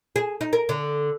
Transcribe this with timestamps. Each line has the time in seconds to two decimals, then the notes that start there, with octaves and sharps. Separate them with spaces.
0.16 G#4
0.41 D#4
0.53 A#4
0.69 D3